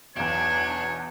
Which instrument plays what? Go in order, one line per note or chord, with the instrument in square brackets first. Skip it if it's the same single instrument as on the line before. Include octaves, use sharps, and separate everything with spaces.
[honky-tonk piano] B1 E2 [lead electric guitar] D4 [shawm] C#5 [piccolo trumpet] G#6